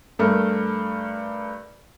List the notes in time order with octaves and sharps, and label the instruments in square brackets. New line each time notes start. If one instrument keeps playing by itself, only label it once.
[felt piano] G2 A3 A#4